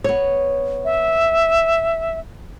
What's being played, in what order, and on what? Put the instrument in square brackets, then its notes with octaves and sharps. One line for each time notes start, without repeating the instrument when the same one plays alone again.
[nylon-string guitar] B3 C#5
[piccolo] E5